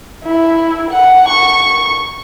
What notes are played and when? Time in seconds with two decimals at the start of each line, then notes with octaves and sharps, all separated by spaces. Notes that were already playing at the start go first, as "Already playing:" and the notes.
0.25 E4
0.91 F#5
1.29 C#6